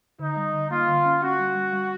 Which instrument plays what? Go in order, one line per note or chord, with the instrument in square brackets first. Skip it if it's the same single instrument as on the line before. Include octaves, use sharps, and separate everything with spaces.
[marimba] D3 [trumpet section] D#4
[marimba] G3
D3
[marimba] A#3 [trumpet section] F4
[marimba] D3
C#4
[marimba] C#4 [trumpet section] F#4
[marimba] G3
G3
G3